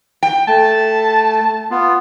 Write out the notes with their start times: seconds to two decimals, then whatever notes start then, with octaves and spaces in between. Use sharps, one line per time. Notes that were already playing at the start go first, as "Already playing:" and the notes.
0.23 G5
0.47 A3 A5
1.71 B3 F4